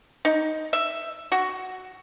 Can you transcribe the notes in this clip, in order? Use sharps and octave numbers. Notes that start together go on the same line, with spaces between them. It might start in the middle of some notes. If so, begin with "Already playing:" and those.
D#4
E5
F#4